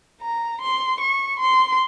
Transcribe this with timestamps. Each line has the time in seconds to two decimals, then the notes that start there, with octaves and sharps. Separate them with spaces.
0.22 A#5
0.62 C6
1.01 C#6
1.40 C6